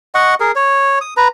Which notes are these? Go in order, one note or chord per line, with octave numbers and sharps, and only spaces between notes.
D#5 F#5 C#6
G#4 A#4
C#5
D#6
B4 A#5